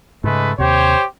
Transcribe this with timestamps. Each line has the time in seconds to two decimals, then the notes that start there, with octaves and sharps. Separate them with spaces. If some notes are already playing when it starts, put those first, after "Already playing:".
0.24 G#2 C#3 G#3 A3 B4
0.58 D#2 C3 G4 C5 C#5